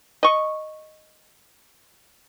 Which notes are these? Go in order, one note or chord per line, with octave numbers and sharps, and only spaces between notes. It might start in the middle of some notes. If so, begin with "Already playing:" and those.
D#5 C#6